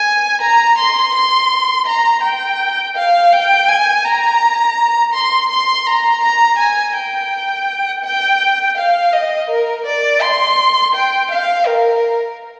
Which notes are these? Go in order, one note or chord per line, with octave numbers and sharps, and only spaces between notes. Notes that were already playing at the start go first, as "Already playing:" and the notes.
Already playing: G#5
A#5
C6
C6
A#5
G5
F5
G5
G#5
A#5
C6
C6
A#5
A#5
G#5
G5
G5
F5
D#5
A#4
D5
C6
G5
F5
A#4